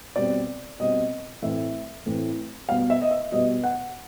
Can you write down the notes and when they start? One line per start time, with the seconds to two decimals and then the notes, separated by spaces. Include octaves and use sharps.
0.16 B2 G3 C4 D5
0.80 B2 G3 C4 D#5
1.42 A2 E3 A3 C4 E5
2.06 A2 E3 A3 C4
2.69 B2 G3 B3 F5
2.90 E5
3.02 D#5
3.11 E5
3.32 B2 G3 B3 D#5
3.64 F#5